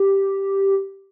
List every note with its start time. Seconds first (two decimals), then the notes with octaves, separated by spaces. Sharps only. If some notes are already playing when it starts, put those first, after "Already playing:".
Already playing: G4